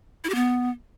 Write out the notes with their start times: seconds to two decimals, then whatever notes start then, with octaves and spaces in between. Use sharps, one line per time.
0.24 E4
0.29 G4
0.35 B3